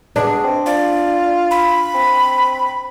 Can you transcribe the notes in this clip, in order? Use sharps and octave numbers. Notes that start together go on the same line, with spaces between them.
B2 D4 G#4
C4
F4 D5
B5
C4